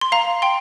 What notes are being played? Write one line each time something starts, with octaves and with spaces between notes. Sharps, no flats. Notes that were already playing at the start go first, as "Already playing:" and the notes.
C6
F5 A#5
G5 C6